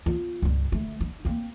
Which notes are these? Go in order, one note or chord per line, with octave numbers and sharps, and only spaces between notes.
B3 F4
C#2 G2
D3 A3
D4
A#3 C4